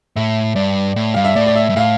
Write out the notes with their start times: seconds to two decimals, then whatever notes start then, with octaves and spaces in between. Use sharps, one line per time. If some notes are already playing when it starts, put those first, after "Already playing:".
0.16 A2 E5
0.55 G2 D5
0.96 A2
1.14 G2 F5
1.25 E5
1.36 A2 D5
1.47 D5
1.56 E5
1.69 G2
1.76 A2 F5